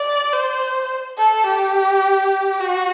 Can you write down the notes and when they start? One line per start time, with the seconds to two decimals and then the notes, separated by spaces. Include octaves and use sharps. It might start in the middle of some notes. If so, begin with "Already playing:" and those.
Already playing: D5
0.33 C5
1.18 A4
1.46 G4
2.60 F#4